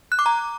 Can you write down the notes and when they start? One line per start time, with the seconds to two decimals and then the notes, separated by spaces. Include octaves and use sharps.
0.12 F#6
0.19 D6
0.26 A#5